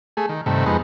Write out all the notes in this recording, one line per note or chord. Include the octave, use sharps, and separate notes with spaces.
A3 G#4
D#3
G2 C3 D#3 A3
F2 G#3 B3 D#4